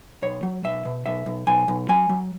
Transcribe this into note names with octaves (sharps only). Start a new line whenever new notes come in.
B1 C#5
F#3
B1 E5
B2
B1 E5
B1
B1 G#5
B1
F#3 G#5
F#3